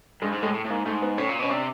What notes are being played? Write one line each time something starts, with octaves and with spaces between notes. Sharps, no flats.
G2 G#3
G#2
A2 G#3
A2
A2
G#2 A#3
G#2 A3
B3
A2 C#4
A#2
B2 C#4
C3 D4